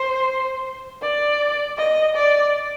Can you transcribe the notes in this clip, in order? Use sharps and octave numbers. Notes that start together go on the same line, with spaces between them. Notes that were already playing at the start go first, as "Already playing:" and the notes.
Already playing: C5
D5
D#5
D5